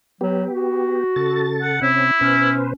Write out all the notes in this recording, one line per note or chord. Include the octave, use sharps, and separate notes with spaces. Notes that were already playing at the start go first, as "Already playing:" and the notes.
F#3 B3 G4
F#4
C#3 A4 A6
F#5
C3 C4 C#4 E4
B2 C#4 B4 C5